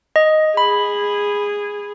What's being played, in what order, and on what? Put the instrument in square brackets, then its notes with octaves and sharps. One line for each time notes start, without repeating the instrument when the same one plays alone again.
[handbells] D#5
[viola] G#4 [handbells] B5